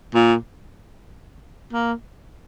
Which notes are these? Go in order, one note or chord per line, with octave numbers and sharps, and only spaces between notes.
A#2
A#3